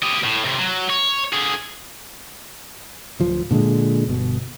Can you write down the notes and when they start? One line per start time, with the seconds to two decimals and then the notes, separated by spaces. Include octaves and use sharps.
0.03 G4 D#5
0.24 A2
0.45 A2 C3
0.59 F#3
0.90 C#5
1.33 D3 G#4
3.20 D1 F3
3.51 A#2 D3 F#3 G#3
4.07 G1 B2